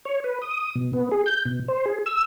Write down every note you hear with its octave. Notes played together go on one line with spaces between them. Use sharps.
C#5
B4
D#6
B2
B3
G#4
G6
B2
C5
G#4
E6